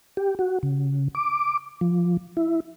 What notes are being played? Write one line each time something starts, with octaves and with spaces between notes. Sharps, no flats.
G4
F#4
C#3
D6
F3
E4